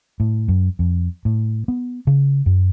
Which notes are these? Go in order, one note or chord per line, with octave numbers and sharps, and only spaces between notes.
A2
F#2
F2
A2
B3
C#3
F#2